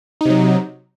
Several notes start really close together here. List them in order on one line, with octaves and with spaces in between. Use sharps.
D#4 C3 F#3